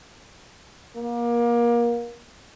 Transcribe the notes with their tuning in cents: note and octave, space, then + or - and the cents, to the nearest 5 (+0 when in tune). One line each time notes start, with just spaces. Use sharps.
A#3 +25